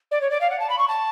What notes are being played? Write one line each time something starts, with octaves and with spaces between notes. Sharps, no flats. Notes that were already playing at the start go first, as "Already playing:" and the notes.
D5
C#5
D5
F5
F#5
A5
B5
C#6
A5